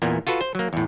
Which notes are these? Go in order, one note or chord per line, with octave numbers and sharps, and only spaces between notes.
E2 A#2 A#3 B3
F4 F#4 A4 B4
C5
F#3 A#3
E2 A2